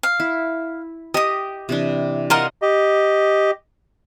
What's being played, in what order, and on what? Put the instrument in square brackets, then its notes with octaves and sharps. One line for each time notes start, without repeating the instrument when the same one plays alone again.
[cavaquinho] F5
[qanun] E4
[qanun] G4 [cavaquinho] D#5 D#6
[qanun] C3 E3 D4
[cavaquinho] F4 A#4 F#5 [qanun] C5 D5 D#5
[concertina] G4 D#5